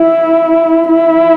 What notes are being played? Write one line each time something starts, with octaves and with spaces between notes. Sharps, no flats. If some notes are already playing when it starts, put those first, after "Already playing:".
Already playing: E4
E4